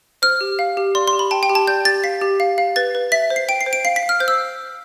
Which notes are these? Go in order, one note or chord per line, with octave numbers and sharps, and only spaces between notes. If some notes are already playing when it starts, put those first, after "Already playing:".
C5 F6
G4
F5
G4
D5 C6
C6
G4
B5
G5 A5
G5
G4
A5
D5 G6
G4 A6
F5 B6
G4
F5
F5
B4 A6
B4
E5 B6
C5
C7
G5 D7
C7
C5
D7
F5 C7
B6
F5
F6
C5 G6
E6